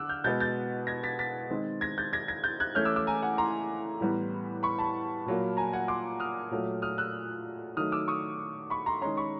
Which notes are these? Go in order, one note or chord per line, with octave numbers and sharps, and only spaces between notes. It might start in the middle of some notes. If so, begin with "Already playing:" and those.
Already playing: D3 D6 E6 F#6
F6 G6
B2 G#3 B3 G6 A6
G6 A6
G#6 A#6
A6 B6
A6 B6
D#3 G#3 C4
G#6 A#6
G6 A6
G#6 A#6
G#6 A#6
G6 A6
F#6 G#6
E3 A3 C#4 F6 G6
D6 E6
D6 E6
G#5 A#5
F#5 G#5
A#5 C6
A2 E3 G3 B3
B5 C#6
A5 B5
A#2 F#3 A#3
G#5 A#5
F#5 G#5
C6 D6
D#6 F6
A#2 F#3 A3
D#6 F6
E6 F#6
D#3 F#3 A3 D#6 F6
D6 E6
C#6 D#6
B5 C#6
A#5 C6
D#3 G#3 C#4 A#5 C6
B5 C#6